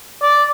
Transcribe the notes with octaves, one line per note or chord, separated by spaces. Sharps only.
D5